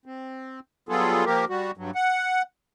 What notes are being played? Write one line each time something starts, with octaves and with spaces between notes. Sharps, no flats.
C4
F#3 G3 B3 F4 G#4 A4
F3 A#3 G4 A#4
G3 F#4
G2 F#3
F#5